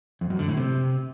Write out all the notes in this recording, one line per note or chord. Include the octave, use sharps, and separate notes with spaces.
F2
F#2
D3
A2
C3